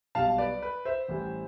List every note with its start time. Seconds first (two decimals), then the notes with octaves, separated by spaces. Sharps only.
0.15 B1 B2 G3 F5 A5
0.38 B4 D5
0.62 B4
0.85 C5 E5
1.09 A1 A2 E3 G3